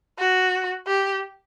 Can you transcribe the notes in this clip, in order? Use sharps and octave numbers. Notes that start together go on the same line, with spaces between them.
F#4
G4